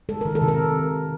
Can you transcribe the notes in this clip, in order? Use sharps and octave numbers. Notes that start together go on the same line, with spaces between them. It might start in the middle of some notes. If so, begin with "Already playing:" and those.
G#3 A4
D#3 A#4
A4
C3
A#4